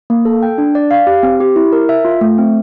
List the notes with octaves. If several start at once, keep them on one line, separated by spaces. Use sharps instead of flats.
A#3
A4
G5
D4
D5
F5
G4
C4
G4
E4
A#4
E5
F4
A3
C4